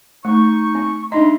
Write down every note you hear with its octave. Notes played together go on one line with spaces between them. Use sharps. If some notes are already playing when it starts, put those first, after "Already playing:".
A3 D#4 C#6
C4
D4 D#4 D#5 E5 A#5 C6